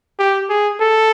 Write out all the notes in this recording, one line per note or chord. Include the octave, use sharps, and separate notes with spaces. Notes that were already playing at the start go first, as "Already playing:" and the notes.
G4
G#4
A4